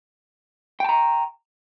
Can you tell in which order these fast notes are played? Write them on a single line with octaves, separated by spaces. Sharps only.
G5 A5 A#5